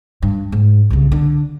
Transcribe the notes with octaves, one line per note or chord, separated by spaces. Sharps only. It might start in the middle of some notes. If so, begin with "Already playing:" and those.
G2
G#2
C2 C#3
D3